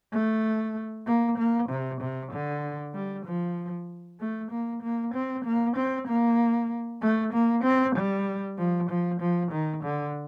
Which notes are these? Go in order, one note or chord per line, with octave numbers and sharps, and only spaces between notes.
A3
A#3
A#3
C3
C3
D3
G3
F3
A3
A#3
A#3
C4
A#3
C4
A#3
A3
A#3
C4
G3
F3
F3
F3
D#3
D3